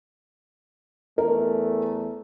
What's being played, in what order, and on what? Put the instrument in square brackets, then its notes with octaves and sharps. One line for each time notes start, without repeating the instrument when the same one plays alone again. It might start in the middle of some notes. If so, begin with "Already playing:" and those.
[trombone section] E2 A3 [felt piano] A#4